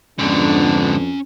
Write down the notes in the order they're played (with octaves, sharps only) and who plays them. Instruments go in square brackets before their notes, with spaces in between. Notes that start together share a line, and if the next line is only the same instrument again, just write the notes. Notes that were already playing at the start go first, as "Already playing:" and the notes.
[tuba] F2 [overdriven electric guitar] G#2 D3 [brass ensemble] B3 D4 [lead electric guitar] C#4 A#5